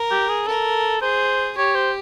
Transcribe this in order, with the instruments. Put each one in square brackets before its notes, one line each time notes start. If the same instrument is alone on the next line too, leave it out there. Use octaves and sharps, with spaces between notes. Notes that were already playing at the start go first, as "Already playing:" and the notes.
Already playing: [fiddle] A#4
[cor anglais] G4
G#4
[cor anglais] A4 [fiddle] A#4
[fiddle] G#4 [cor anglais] C5
[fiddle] G4 [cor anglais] C#5
[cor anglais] C5